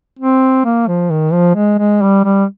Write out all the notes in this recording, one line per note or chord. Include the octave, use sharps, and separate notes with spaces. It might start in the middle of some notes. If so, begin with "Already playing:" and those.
C4
A#3
F3
D#3
F3
G#3
G#3
G3
G3